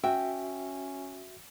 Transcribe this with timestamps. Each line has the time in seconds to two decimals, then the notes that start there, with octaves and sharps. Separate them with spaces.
0.04 C#4 F#4 E5 G5